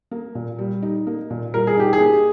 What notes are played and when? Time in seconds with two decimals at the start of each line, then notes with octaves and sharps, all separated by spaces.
0.11 A#3
0.35 A#2
0.58 G3
0.82 D#4
1.07 A#3
1.30 A#2
1.54 G3 A#4
1.67 G#4
1.77 D#4 G4
1.93 G#4
2.01 A#3